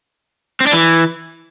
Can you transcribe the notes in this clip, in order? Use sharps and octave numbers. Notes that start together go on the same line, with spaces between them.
C4
D4
E3